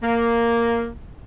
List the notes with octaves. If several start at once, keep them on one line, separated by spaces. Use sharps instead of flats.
A#3